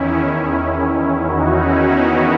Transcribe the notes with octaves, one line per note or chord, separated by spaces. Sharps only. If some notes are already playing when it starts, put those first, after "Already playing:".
Already playing: E2 D#3 C#4 E4
D#4 F#4
C#4 E4
B3 D#4